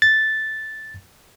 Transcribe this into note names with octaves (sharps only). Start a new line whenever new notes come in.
A6